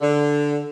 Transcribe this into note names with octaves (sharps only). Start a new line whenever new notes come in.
D3